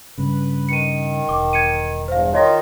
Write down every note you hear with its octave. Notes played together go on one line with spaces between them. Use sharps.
G2 C#3 B4
D#3 C#7 D#7
E1 D6
G#6 C#7 D#7
E2 G2 C5 F5
D#3 D#4 F4 C#5 D#5 A#6